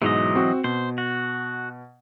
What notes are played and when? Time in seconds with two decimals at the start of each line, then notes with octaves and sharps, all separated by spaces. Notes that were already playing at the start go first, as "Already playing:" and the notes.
0.02 G#2 B2 E3 F#3 G#3 D#5
0.35 C4 F#4
0.64 B2 C5
0.98 F#4